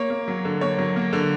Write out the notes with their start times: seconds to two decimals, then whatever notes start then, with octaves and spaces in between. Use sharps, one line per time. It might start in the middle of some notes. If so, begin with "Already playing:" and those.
Already playing: A#3 C#5
0.10 A#3
0.28 F#3
0.45 D3
0.61 A#3 C#5
0.79 F#3
0.96 A#3
1.13 D3